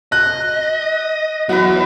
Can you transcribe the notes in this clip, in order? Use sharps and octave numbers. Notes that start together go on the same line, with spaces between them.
D#5 F#6
F#3 B3 E4 B4 F#5